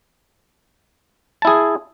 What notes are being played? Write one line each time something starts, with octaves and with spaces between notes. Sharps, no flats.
E4 G#4 A5